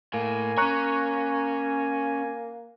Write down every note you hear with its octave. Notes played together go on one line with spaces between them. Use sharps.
A2 A3 A#3 G#5
C#4 C#5 A#5 C#6 F#6